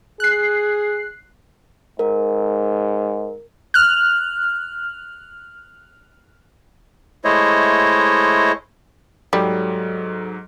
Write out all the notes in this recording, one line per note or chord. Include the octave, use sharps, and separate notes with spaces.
G#4 F#6 C7
G#2 A#4
F6 F#6
G#3 A3 E4 C5 C#5 D#5
G#2 F#3 G3 A4